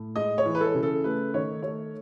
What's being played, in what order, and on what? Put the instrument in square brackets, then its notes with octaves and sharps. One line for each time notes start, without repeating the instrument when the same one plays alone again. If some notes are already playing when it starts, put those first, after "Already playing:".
Already playing: [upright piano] A2
G#3 D#5
C#5
E3
B4
A4
C#3
A4
A3 B4
D#3 C#5
A3 C#5